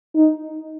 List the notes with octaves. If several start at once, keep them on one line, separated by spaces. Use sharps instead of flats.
D#4